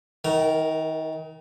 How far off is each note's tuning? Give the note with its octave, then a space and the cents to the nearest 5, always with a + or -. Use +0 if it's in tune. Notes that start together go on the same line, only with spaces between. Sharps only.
D#3 +35 A#4 +0 G5 -45